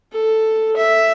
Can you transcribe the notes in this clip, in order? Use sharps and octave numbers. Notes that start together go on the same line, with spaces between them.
A4
E5